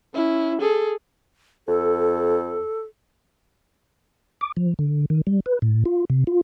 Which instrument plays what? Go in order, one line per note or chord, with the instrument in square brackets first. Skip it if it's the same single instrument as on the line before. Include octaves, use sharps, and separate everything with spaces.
[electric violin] C#4 E4
G#4 A4
[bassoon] F2 [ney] A4
[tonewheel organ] D6
F3
D3
D#3
G3
B4
A2
F4
C3
F4